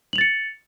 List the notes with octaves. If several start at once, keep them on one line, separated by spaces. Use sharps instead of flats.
A6 C#7 F7 F#7